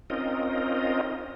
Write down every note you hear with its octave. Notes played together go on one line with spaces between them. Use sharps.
C4 C#4 D#4 F4 A#4 D#5